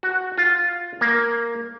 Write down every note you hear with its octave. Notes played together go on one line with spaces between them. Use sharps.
F#4
F4
A#3